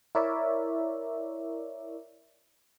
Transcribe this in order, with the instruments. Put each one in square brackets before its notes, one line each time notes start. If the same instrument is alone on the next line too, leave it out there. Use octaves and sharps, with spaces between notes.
[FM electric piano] E4 A#4 C#5 D5 E5